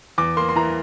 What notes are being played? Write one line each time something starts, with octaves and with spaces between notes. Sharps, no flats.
E2 D6
A#3 C6
C6
E3 A#5